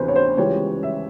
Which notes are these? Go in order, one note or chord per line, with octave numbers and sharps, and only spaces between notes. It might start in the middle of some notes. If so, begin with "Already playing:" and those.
Already playing: D2 C3 E3 B3 B4 C5
C#5
C5
C#2 C#3 E3 G3 C#5
E5